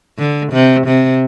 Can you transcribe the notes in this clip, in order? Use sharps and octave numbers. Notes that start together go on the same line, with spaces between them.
D3
C3
C3